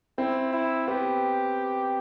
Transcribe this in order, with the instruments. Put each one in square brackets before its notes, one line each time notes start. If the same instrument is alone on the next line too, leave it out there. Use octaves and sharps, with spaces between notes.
[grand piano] C4 [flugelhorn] E4
[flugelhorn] E4
[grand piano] B3 [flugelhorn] G4